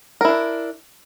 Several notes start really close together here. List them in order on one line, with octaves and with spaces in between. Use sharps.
A#4 E4 D4